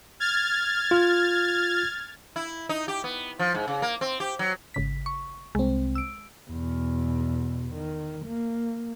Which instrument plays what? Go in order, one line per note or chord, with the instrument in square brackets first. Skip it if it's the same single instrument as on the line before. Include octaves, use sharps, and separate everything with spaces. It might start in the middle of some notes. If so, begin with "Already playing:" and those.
[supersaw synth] F6 G#6 A6
[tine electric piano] F4
[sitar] E4
D#4
G4
B3
F3
G#2
C#3
A#3
C4
G4
F#3
[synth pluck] G#1 C#3 B6
C#6
[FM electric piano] C2 C4 [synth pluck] G#3
[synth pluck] E6 D7
[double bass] E2 B2
D#3
A#3